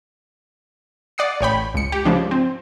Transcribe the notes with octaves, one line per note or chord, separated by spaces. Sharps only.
D5 F#5 D#6 C7
A1 C#5 G5 B5
C#2 C#7
G4
G#2 C#3 F3 D4
C4